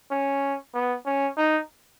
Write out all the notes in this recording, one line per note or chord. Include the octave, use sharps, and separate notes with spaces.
C#4
B3
C#4
D#4